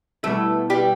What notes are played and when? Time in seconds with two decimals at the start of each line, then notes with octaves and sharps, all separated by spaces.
0.23 B2 G3 A3 B3 E4 A4
0.70 G3 G4